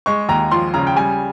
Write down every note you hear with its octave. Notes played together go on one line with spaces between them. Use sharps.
G#3 C#6
D#2 A#5
F3 C6
C#3 A#5
G5
G3 G#5